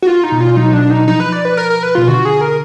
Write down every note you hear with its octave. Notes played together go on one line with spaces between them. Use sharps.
F#4
F4
D#4
B2
F4
F#3 D#4
D4
D#4
F3 D#4
B4
D5
B4
A#4
A#4
B4
B2 F4
D3 F#4
G#4
A#4